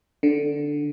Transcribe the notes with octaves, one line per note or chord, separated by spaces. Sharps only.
D3